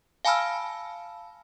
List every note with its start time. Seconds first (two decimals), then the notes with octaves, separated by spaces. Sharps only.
0.25 F5 G#5 A5 B5 E6 F6